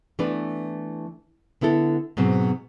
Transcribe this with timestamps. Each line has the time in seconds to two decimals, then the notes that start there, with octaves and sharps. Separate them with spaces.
0.19 E3 A3 B3 D4 B4
1.61 D3 B3 E4 A4
2.17 G#2 B2 F#3 C4